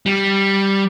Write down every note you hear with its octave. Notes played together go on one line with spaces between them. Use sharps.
G3